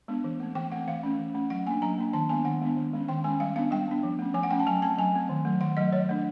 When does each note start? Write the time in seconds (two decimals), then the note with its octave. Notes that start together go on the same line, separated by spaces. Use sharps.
0.08 G#3 B3 D4
0.24 E3
0.40 A3 C4
0.55 E3 G5
0.72 A3 C4 F#5
0.88 E3 F5
1.03 A3 C#4
1.19 E3
1.35 A3 C#4
1.50 F#3 F#5
1.66 A#3 G#5
1.71 D4
1.82 F#3 A#5
1.98 A#3 D4
2.13 D#3 A5
2.29 G#3 B3 D4 G#5
2.45 D#3 F#5
2.61 G#3 B3 D4
2.77 D#3
2.93 G#3 C#4
3.08 D#3 G5
3.24 G#3 C#4 G#5
3.40 G3 F5
3.55 B3 D4 F5
3.71 G3 G5
3.88 B3 D4
4.03 F3
4.19 A3 C#4
4.34 F3 G#5
4.43 F#5
4.51 A3 C#4 G5
4.60 A5
4.67 F#3 G#5
4.82 A3 C4 A5
4.98 F#3 G#5
5.14 A3 C4
5.29 D#3
5.45 F#3 A3
5.61 D#3 F#5
5.77 F#3 A3 D#5
5.93 F#3 C#5
6.09 A3 D4